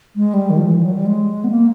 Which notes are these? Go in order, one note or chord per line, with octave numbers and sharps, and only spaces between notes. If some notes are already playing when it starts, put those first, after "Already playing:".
G#3
G3
D#3
F3
E3
F#3
G3
G#3
B3
A#3